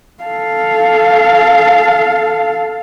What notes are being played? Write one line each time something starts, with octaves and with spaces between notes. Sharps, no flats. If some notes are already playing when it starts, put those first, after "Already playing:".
A4 F5